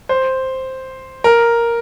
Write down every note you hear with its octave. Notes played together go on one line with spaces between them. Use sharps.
C5
A#4